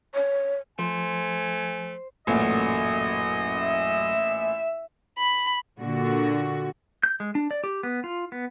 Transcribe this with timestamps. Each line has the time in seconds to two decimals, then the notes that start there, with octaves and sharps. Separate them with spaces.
0.14 C#5
0.79 F3 A3 C5 G#5
2.27 A1 F#2 A#2 A3 D#5
3.61 E5
5.18 B5
5.80 A#2 D3 F#4
7.03 G6
7.20 G#3
7.35 D4
7.51 D5
7.64 G4
7.83 B3
8.04 F4
8.32 B3